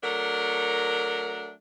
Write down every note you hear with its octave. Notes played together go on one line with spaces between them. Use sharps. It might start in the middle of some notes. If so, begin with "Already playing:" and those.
F#3 A3 D4 A#4